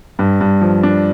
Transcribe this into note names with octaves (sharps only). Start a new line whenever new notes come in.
G2
G2
F3
D4